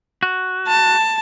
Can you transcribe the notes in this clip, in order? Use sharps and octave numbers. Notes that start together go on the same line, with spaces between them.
F#4
A5